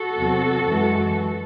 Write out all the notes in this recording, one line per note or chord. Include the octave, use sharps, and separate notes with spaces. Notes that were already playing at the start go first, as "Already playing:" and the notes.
Already playing: F#4 A4
E2 C3 F#3
F#2 E3 G#3